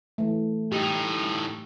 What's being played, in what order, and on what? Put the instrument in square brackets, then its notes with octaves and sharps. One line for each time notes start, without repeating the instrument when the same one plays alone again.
[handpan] E3 A3
[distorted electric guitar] A2 D#4 [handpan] G4